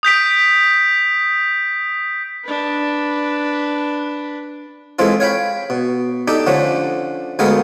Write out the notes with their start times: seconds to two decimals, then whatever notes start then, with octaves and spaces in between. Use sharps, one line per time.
0.03 D#6 G6 B6 D7
2.44 D4 B4
4.99 E3 G#3 C4 F4 A4
5.20 C#5 F5 G5 B5
5.70 B2
6.28 D4 D#4 G4 A4
6.47 D3 F3 A3 C#4
7.39 D2 G#3 B3 A4 A#4 F5